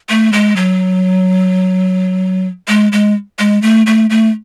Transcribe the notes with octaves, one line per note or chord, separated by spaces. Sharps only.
A3
G#3
F#3
G#3
G#3
G#3
A3
A3
A3